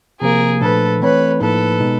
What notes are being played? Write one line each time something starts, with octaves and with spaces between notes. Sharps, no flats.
C3 F3 A#3 G#4 A#4
A#2 F3 A3 D4 A4 B4
E3 A3 C4 B4 C#5
A2 F3 A#3 D#4 A4 B4
B2 G#3 B3 D#4